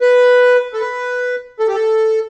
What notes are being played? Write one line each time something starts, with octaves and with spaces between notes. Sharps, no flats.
B4
A4
B4
A4
G4
A4